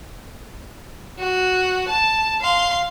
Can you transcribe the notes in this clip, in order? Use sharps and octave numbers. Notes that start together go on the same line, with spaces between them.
F#4
A5
F5 C6